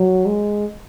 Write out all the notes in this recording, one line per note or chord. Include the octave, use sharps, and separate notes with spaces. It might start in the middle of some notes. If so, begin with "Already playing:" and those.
Already playing: F#3
G#3